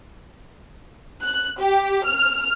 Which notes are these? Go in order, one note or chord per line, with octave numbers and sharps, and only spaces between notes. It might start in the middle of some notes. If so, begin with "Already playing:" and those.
F#6
G4
F6